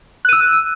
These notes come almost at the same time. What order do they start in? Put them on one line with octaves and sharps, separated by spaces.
F#6 D#7 E6